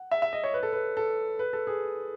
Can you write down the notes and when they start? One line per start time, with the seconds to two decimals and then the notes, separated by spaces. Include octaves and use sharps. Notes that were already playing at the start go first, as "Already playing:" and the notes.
Already playing: F#5
0.11 E5
0.22 E5
0.33 D#5
0.44 C#5
0.54 B4
0.63 A4
0.73 B4
0.97 A4
1.39 B4
1.53 A4
1.67 G#4